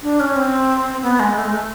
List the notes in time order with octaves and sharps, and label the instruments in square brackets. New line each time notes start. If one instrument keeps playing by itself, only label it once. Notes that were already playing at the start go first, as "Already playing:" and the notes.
[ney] D4
C#4
C4
B3
G#3
A3
G#3
A3